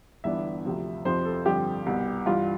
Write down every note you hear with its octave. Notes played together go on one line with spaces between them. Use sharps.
G1 G2 E3 B3 D4 E5
D2 C3 F3
F2 C3 F3 C4 C5
A4
G2 D3 F3 C4 G4
C2 B2 B3
G2 E3 G3 D4 F4